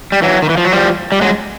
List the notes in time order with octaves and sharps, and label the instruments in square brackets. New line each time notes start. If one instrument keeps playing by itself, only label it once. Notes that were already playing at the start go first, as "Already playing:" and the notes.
[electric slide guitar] G3
E3 F#3
D#3
E3
F3
F#3
F3 G3
G3
F#3 G#3